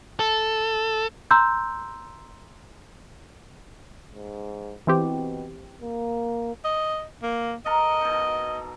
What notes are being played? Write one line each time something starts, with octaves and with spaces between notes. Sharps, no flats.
A4
A#5 C6 E6 G6
G#2
B2 E3 C4 G4
A#3
D#5
A#3
A4 A#4 D#5 A#5
B2 D#4